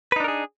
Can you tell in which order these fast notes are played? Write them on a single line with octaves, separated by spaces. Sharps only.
B4 D#4 D4 A#4 G#4